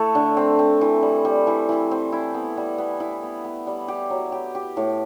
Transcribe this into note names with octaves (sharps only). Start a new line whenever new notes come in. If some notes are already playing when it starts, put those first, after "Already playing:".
Already playing: A3 E4 A4
D3
C4
C4
E3
G3
G3
E3
E3
C4
E4
B3
G3
B3
E4
B3
B3
G3
G4
F#3
G4
G4
A2